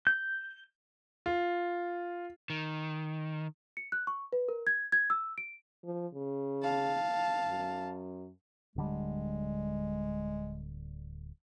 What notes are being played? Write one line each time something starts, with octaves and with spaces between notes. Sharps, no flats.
G6
F4
D#3
C#7
F#6
C#6
B4
A#4
G#6
G#6
E6
D7
F3
C#3
F5 A5
F#2
D1 D3 G3 G#3